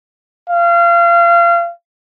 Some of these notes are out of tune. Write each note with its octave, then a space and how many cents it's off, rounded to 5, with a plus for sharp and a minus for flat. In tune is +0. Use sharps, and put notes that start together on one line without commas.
F5 -30